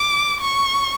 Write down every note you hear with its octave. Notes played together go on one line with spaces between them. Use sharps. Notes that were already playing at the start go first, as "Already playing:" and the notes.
Already playing: D6
C#6